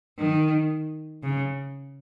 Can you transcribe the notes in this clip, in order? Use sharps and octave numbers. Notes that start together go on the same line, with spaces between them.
D#3
C#3